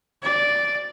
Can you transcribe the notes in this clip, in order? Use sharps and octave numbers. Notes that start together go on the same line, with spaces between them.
D5